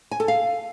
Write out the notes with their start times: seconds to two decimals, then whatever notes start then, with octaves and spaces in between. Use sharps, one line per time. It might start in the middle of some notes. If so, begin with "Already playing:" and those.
0.11 G#5
0.20 A4
0.28 F5